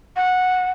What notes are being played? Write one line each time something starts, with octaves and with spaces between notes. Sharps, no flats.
F#5